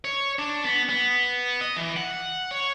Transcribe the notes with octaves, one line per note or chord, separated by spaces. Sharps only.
C#5
D4
B3
B3
D#5
E3
F#5
C#5